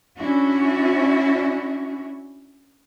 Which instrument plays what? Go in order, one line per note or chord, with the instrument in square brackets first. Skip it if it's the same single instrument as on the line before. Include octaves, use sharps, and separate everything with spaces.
[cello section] C#4 D4 E4 F#4